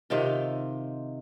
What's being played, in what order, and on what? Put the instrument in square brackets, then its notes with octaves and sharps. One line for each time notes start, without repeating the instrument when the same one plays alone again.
[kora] C3 D#3 F4